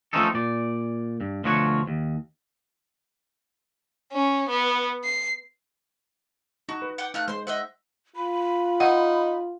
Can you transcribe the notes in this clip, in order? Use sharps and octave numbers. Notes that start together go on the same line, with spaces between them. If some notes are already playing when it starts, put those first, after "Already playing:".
F3 A3 C4 C#4 D#4 A4
A#2 D5
G2
D2 B2 F3 F#4 C#5
D#2
C#4
B3
C7
D#4 F#4
B4
F#5 G5 D6
A3 D#4 F5 F#6
G#3 C5 C6
C5 D#5 E5 F#5
F4 B5
D#4 F#5